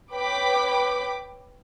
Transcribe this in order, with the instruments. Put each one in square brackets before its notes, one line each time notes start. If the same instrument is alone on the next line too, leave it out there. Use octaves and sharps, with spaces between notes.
[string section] B4 C#5 G5 B5 D6 B6